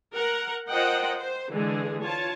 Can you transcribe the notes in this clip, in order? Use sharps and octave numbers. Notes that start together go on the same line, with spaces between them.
A#4 F#5
F4 A#4 C5 D#5 F#5 G5
C5
D3 E3 G#3 G#4
F4 C#5 A5